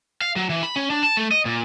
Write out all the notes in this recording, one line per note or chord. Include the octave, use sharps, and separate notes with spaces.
F5
F#3
E3
B5
C#4
D4
A5
A3
D#5
A#2